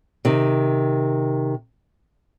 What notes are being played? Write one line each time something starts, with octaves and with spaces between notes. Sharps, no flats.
C3 D#3